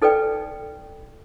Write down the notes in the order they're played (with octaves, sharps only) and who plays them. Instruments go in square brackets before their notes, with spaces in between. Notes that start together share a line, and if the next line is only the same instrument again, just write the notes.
[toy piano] D#4 A4 B4 D5 G5